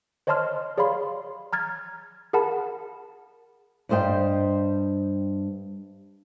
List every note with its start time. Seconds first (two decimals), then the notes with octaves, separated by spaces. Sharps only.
0.27 C5 C#5 D#5 A5 C6 F6
0.78 G#4 C#5 D5 F5 B5 C6
1.53 A#5 F6 G#6 A6
2.33 G#4 A#4 F#5 A5 B5
3.89 G2 G3 C5 D#5 G5